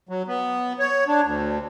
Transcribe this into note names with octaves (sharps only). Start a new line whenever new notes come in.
F#3
B3
C#5
D4
D2